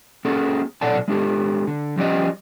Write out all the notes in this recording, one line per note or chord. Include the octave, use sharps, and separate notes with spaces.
A#3 C#4 F#4 G#4 A4
B1 A#2 A4 D5 F#5 A5
G#3 D4 G4 A4
D3
F3 G3 C#4 G4 B4 D#5